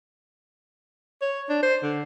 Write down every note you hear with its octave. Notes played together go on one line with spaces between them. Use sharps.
C#5
D4
C5
D3